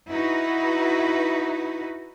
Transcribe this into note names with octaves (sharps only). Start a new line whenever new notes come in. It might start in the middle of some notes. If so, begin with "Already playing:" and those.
D#4 E4 F#4 B4